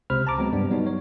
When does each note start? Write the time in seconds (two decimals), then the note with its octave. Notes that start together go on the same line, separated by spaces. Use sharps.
0.10 C#2 C3 C5 B5 F6
0.27 A5 A#5 D6
0.38 F#3 G#3 B3 C4
0.53 G2 G3 B3 D4
0.70 F#3 G3 B3 D#4 C#5
0.87 C#5